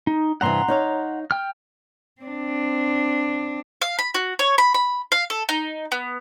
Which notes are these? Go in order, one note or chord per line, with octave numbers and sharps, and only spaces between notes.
D#4
G2 C3 E3 F#5 A#5 C6
D#4 C#5 F5
G5 F6
C4 D4
F5
B5
F#4
C#5
B5
B5
F5
A4
D#4
B3